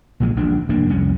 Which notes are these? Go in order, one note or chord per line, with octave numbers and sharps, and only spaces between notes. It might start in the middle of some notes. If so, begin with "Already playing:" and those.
A#1 A#2 E3 G#3
D#1 A#1 E3 D4
F1 G2 A#3 D4
F1 C2 C#4